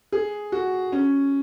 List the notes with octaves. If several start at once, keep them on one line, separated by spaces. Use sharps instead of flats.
G#4
F#4
C#4